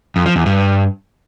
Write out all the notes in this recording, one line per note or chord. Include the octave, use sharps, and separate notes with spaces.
F2
F3
E2
G2